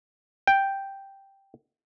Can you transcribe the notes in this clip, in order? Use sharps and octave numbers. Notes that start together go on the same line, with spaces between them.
G5